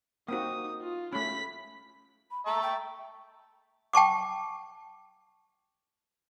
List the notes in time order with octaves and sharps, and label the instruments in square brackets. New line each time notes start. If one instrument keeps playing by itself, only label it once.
[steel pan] A#3 C4 F#4 [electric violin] D#4 D#6
[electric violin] F4
[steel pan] A3 C#4 [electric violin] B5 B6
[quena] B5
[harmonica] E5 A5 C#6 [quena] A#5
[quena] G5
[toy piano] G5 A5 C#6 D6